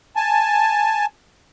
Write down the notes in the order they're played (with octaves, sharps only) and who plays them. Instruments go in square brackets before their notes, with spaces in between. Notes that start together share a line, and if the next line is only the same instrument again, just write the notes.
[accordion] G#5 A5